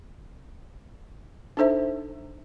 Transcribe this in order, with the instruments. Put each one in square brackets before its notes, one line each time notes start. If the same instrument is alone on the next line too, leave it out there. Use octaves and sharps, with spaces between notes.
[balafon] D4 D#4 A4 C5 E5